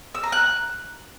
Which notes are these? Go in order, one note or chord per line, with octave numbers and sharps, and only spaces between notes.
E6
A#5
F#6